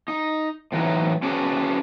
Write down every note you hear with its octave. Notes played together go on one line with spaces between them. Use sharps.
D#4
A2 E3 F#3 D#4
C#4 D4 F#4 G#4 B4